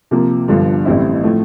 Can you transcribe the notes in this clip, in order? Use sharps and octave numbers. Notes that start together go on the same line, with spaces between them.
C3 F3 A#3
G1 G2 D3 F3
A1 A2 G3 C4 E4
A2 F3 A3